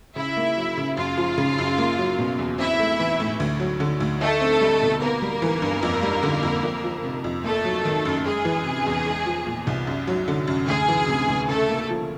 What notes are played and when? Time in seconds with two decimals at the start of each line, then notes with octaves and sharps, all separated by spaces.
0.16 C#3 E4 E5
0.37 A#3
0.57 F#3
0.77 C#3
0.97 F#2 F4 F5
1.18 F3
1.38 C#3
1.58 F#2
1.78 A#3
1.98 F#3
2.18 B2
2.39 E2
2.59 C4 E4 E5
2.79 A3
2.99 E3
3.20 A2
3.40 D2
3.60 F#3
3.80 D3
4.00 D2
4.21 A3 D#4 A4
4.41 C4
4.61 G3
4.81 B2
5.01 A#3 B3 A#4
5.22 G3
5.42 E3
5.62 G2
5.83 F2
6.02 G3
6.23 D3
6.43 F2
6.63 F2
6.84 F3
7.04 C3
7.24 F2
7.44 A3 A#3 A4
7.65 F#3
7.85 D#3
8.05 F#2
8.26 G#3 G#4
8.45 E3
8.66 C3
8.86 E2
9.06 G#3
9.26 F3
9.46 A#2
9.67 C2
9.87 F#2
10.07 F#3
10.28 D3
10.47 F#2
10.68 D2 G#4
10.88 E3
11.08 C3
11.28 D2
11.48 C#3 A3 A4
11.69 A#3
11.90 F3